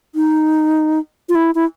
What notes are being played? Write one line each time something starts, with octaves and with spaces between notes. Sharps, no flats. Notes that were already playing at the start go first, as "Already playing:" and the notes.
D#4
F4
E4
E4